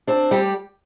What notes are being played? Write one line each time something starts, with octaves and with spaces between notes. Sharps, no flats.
C4 D4
G3 G4